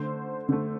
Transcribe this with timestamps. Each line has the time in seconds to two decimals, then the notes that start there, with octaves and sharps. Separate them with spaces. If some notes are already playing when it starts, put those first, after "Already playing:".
Already playing: D3 A3 C5
0.49 D3 A3